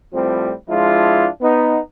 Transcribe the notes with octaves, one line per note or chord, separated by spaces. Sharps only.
A2 F3 G3 C4
F3 G#3 D4 E4 F4
B3 D#4